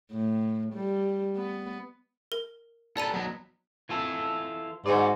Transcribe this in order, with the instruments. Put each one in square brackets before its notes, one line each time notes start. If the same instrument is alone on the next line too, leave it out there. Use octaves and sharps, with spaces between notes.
[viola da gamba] A2
G3
B3
[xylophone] A#4
[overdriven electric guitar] A4 B4 [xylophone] D5 A#5 D#7
[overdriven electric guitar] F#3 B3
[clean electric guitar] E3 F4 A4
[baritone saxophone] G#2 [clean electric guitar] F#4 D5